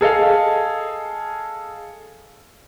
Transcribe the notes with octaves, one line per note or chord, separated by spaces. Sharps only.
G#4 A4 D#5 F5